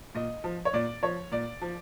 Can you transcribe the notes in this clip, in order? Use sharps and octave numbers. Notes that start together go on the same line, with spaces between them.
A#2 D#5
F3
C#5
A#2 D5
F3 C#5
A#2 D5
F3